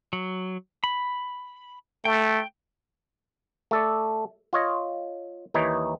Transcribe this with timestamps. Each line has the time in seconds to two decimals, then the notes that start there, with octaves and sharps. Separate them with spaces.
0.13 F#3
0.84 B5
2.05 A3 G5
3.71 A3 A4 D5
4.53 F4 C#5 D#5
5.54 D#2 E3 D#4 C#5